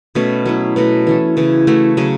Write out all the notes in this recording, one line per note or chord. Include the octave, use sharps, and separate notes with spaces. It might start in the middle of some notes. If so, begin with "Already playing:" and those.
B2 A3 C#4 F#4
F#3 B3 E4
B2 A3 F#4 B4
E3 C#4 A4
C#3 E3 C#4
E3 A3 F#4
C#3 F#3 C#4